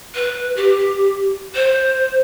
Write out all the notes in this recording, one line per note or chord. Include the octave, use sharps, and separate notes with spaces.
B4
G4
C5